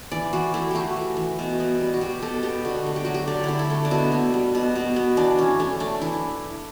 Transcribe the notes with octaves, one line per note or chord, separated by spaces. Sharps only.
E3 D5
E3 F#4
A3 E4
A3 F#4 G4
E3
E3
B2
B3
G3
F#4
B2 G4
B2 A4
B3 G4
D3 F#4
A3
G4
F#3 F#4
G4
D3 D4
D3 E4
E4
A3
D4
B2 E4
B3
G3
B2
B2
B3
E3 D4
E3 C#4
A3 C#4
A3 D4
E3 E4